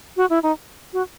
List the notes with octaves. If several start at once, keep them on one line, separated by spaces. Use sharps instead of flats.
F#4
E4
D#4
F#4